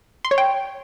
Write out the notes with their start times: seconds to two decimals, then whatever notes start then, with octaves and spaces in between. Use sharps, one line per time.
0.25 C6
0.31 C#5
0.38 G5